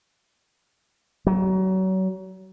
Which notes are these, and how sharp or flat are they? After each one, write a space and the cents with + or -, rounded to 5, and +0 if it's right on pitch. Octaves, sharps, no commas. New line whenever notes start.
F#3 +30